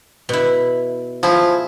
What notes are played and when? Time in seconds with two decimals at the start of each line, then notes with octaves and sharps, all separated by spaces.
0.29 B2 E4
1.23 F3 E4 G#4